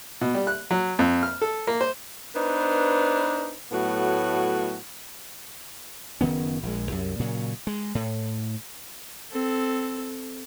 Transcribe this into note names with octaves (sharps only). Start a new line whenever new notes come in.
B2
G3
F#6
F#3
F2
F6
A4
A#3
C5
B3 D4 D#4 B4 C5
A2 F#3 A3 B3 F#4
F#1 D#3 B3 C#4
A#1 G#3
C2 F#2
A#2 C#3 F#3
G#3
A2
C4 A4